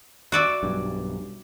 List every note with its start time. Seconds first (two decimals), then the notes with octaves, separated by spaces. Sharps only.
0.32 F#4 D5 E5
0.63 B1 G2